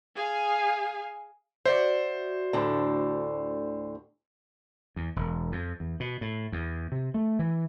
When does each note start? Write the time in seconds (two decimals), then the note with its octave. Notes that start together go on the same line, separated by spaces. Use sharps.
0.15 G#4 F5 G#5
1.65 F#4 C5 D5 E5
2.53 D2 A2 D3
4.96 E2
5.16 E1
5.52 F2
5.80 E2
6.00 B2
6.21 A2
6.52 E2
6.92 C3
7.14 A3
7.39 E3